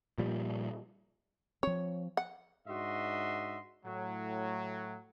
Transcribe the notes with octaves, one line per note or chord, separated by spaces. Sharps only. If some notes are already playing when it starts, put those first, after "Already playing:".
A#2 F3 G3
F3 C4 C#5
F#5
G#2 D4 F#4 D#5 E5 C6
A2 F#3